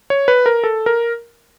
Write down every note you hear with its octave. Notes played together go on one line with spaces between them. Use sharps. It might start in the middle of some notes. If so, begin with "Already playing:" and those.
C#5
B4
A#4
A4
A#4